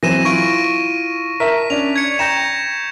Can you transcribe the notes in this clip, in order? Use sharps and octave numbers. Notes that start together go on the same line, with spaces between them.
E3 F#3 C4 A#6 D#7 E7
E4 F4 C#6 A#6 D7
A#4 E5 A5 B6
C#4 D4 F7
G#6 C#7
G5 A#5 G6 A#6 E7